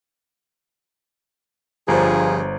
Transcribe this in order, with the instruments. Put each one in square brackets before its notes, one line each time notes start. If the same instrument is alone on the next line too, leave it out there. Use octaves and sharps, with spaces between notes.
[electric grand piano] G1 [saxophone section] G2 G#4 [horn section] F3 [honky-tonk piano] C5 A#5